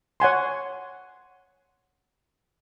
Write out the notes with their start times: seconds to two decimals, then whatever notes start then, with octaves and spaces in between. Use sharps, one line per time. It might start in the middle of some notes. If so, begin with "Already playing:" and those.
0.20 C#5 F#5 G#5 C6